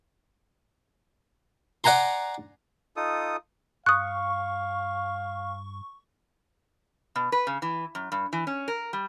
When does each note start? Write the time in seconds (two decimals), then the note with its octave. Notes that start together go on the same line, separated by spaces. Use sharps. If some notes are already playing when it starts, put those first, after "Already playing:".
1.84 D5 F#5 G#5 A#5 C6
2.96 D#4 F4 A4 D#6
3.86 G2 F5 C#6 D#6 F#6
7.16 B2
7.32 B4
7.47 C#3
7.62 E3
7.95 F#2
8.12 G2
8.33 E3
8.47 C#4
8.68 A#4
8.93 G3